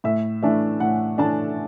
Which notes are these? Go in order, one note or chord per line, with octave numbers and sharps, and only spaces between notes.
A2 E5
E3 A3 D4 E5
A2 F#5
E3 A3 D4 A5